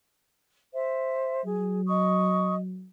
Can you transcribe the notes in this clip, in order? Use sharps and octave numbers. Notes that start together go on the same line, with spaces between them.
C5 E5
F#3 G#4
D#5 C#6 D#6